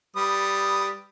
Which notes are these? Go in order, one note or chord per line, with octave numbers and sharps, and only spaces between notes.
G3 B4 D#6